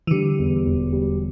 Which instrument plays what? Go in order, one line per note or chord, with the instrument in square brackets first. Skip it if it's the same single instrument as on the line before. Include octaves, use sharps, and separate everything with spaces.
[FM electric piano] E3
[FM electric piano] D3 [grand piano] G3
[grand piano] E2
E1
G3